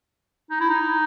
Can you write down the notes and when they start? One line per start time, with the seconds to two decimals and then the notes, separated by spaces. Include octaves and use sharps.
0.51 D#4
0.60 E4
0.70 D#4